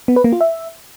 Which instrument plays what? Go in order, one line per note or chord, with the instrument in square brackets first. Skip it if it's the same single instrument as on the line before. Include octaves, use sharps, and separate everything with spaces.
[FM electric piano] B3
B4
A#3
F4
E5